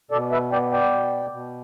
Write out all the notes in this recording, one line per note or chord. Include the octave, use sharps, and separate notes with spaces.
B2 A4 D5
B4 E5
B3 D5 G5
D5 G5
B2
B2